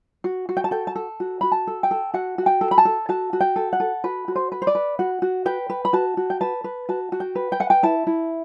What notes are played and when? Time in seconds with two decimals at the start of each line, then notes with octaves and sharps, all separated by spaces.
0.24 F#4
0.49 F#4
0.57 G5
0.64 A5
0.71 A4 G5
0.87 A5
0.96 A4
1.20 F#4
1.41 F#4 B5
1.52 A5
1.67 A4
1.83 G5
1.91 A4
2.14 F#4 F#5
2.38 F#4
2.46 G5
2.61 A4
2.71 B5
2.78 A5
2.85 A4
3.09 F#4 A5
3.33 F#4
3.41 G5
3.56 A4
3.73 F#5
3.80 A4
4.04 F#4 B4
4.28 F#4
4.36 C5
4.52 B4
4.62 C5
4.67 D5
4.75 B4
4.99 F#4 F#5
5.22 F#4
5.46 B4 G5
5.70 B4
5.85 B5
5.93 F#4 A5
6.17 F#4
6.30 G5
6.41 B4 A5
6.64 B4
6.89 F#4 A5
7.12 F#4
7.20 G5
7.35 B4
7.52 G5
7.60 B4 F#5
7.70 G5
7.83 E4 A5
8.07 E4